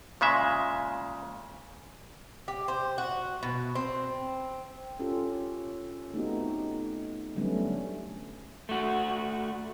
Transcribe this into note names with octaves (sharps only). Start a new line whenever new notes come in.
A#2 C#3 G#3 E5
G4
C5
F#4
B2
C4
C#4 F4 G4 A4
A3 B3 C4 D#4 F#4 G4
D3 F#3 G3 A3 B3 C#4
A3 F#4